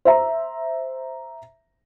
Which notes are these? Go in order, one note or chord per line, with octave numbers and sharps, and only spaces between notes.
C5 E5 A#5